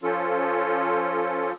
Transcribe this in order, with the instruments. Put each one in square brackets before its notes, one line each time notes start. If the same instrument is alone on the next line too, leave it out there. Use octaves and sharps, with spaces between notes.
[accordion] F3 C#4 F4 A4